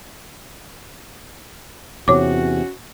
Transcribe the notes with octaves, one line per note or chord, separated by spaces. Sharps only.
E2 C3 C#4 F#4 C#5 D6